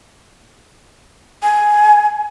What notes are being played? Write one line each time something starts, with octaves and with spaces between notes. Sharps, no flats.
G#5